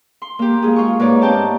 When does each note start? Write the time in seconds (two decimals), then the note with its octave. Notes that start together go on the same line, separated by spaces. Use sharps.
0.22 C6
0.39 A#3 G4
0.63 G#3 F4 G#4
0.76 F4 C#6
1.00 G#2 A#3 D#4 B4 C#5 D5
1.22 A#3 C4 G4 G5 A5